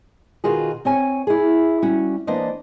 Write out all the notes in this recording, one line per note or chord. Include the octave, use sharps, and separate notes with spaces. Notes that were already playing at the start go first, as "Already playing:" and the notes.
B2 D#3 F4 F#4 G#4
C4 C#5 G#5
E4 G#4
G3 C#4 F#4
E3 A#3 B3 D4 C5 D#5